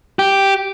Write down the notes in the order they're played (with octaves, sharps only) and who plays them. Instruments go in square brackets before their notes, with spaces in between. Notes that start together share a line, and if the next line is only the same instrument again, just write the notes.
[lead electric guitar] G4